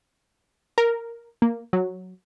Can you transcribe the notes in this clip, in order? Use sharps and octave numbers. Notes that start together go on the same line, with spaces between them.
A#4
A#3
F#3